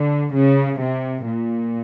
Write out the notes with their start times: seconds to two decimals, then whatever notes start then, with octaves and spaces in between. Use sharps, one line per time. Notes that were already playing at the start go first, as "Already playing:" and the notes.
Already playing: D3
0.34 C#3
0.80 C3
1.26 A#2